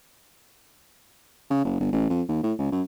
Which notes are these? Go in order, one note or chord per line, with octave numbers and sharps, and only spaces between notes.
C#3
F#1
G1
A1
F2
D#2
A2
C#2
F#2